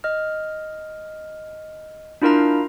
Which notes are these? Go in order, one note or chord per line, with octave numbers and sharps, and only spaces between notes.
D#5 F6
D4 E4 F4 A#4 F5 A#5